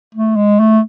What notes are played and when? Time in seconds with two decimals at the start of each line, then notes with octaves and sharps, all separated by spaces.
0.14 A3
0.36 G#3
0.59 A3